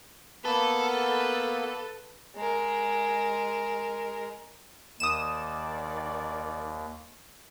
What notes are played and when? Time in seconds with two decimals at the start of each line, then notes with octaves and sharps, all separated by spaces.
0.45 A#3 B3 A4 B4
2.36 G#3 A#4
5.00 D#2 D#3 D5 D#6 E7